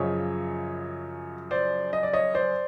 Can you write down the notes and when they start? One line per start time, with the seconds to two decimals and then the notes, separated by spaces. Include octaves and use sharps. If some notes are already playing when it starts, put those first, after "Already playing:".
Already playing: F#2 C#3 F3 C#5 D#5
1.51 C5 D5
1.93 D#5
2.03 D5
2.13 C#5 D#5
2.34 C5 D5